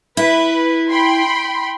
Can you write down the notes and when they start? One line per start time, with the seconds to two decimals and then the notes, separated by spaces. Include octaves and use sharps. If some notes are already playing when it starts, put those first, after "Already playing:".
0.17 E4 B4
0.91 G5 B5 C6